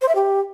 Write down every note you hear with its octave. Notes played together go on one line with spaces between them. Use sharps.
C5
E5
G4